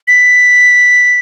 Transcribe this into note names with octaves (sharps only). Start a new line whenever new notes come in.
B6